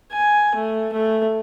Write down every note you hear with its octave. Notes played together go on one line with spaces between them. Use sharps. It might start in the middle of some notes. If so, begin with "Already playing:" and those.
G#5
A3
A3